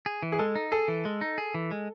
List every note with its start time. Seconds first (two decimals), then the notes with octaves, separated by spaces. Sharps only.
0.06 G#4
0.23 E3
0.32 G#4
0.39 G#3 A4
0.55 D#4
0.72 G#4 A4
0.88 E3
1.05 G#3
1.21 D#4
1.38 G#4
1.54 E3
1.71 G#3